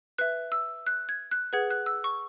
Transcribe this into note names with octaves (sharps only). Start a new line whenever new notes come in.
B4 E5 F#6
E6
F#6
G#6
F#6
G#4 B4 F#5 G#6
F#6
E6
C#6